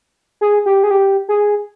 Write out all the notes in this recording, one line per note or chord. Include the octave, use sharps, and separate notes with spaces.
G#4
G4
G#4
G4
G#4